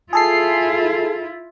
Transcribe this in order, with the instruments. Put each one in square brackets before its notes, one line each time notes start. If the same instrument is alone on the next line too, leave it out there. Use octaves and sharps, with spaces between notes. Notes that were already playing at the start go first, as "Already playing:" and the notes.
[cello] E4 F4 [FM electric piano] G#4 A4 C7